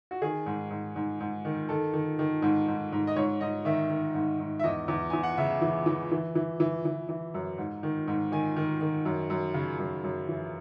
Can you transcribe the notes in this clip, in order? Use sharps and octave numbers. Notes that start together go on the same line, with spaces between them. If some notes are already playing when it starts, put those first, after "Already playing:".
F#4
D#3 G#4
G#2
G#2
G#2
G#2
D#3
D#3 A4
D#3
D#3
G#2
G#2
G#2
D#5
G#2 C#5
G#2 D#5
D#3 E5
D#3
G#2
G#2
E5
E2 D#5
E2
E2 G#5
F#5
C#3 E5
E3
E3
E3
E3
E3
E3
E3
F#2
G#2
D#3
G#2
D#3 G#5
D#3
D#3
F#2
F#2
C#3
F#2
F#2
E3